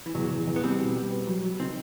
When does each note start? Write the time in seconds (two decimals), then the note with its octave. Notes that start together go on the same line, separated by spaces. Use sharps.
0.06 E3
0.15 E2 F#3
0.31 E2
0.47 E2
0.56 B3
0.63 G3 C4
0.79 B2
0.95 G3
1.12 B3
1.27 F#3
1.43 F#3
1.60 D#3 C4